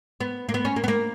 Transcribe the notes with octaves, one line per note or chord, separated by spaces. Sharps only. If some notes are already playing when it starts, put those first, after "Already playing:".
B3
A#3
B3
C#4
A#3
B3
A#3